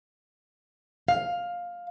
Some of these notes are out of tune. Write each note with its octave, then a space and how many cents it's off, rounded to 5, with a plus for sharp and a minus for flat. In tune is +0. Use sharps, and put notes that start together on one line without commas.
F5 +10